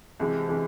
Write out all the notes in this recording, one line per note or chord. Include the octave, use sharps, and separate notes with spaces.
C2 C3 E3 G#3
C3 E3 G#3